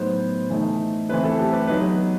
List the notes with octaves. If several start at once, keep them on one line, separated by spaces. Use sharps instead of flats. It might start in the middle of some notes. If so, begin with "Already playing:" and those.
Already playing: A2 F#3 B3 D#4 C5
E3 A3 D#4
E3 A3 C4 E4 B4
A4
G4
B4
F#3 B3 D#4 B4